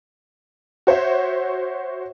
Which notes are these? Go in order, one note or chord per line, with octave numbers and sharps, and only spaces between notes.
F#4 C5 C#5 E5